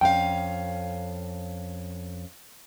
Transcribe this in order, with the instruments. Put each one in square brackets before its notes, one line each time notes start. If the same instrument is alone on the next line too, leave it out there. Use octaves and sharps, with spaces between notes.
[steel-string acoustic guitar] F2 C#4 F5 [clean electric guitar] G5